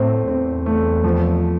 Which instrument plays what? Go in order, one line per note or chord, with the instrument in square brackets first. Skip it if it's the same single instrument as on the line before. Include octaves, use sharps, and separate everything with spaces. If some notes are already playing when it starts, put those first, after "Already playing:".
Already playing: [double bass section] A2 [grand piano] A3 C4
[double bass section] E2 [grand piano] C4
[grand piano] A3
F3